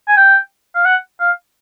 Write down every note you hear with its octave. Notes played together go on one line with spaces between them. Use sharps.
G#5
G5
F5
F#5
F5